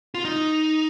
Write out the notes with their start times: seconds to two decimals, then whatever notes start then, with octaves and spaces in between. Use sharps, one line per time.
0.15 F4
0.25 D#4